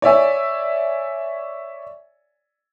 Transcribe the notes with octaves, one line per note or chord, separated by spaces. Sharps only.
C#5 D5 E5 G#5